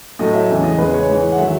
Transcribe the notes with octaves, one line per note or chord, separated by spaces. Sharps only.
A2 F#3 A3 D#5
E5
E2 C#3 E3 G#3
D#5
E2 C#3 G#3 B4
C#5
G#2 E3 G#3
F#5
D#3 F#3 E5